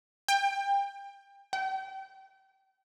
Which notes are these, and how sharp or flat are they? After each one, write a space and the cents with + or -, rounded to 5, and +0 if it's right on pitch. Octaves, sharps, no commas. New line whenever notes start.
G5 +25
G5 -30